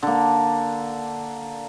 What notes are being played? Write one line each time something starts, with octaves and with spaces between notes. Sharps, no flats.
D3 A#3